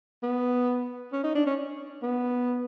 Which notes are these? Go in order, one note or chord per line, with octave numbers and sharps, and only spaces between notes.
B3
C#4
D#4
D4
C#4
B3